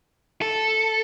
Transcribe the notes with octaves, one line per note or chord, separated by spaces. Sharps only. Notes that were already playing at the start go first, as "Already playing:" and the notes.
A4